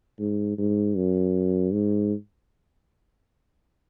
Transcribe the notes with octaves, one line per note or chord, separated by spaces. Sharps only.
G#2
G#2
F#2
G#2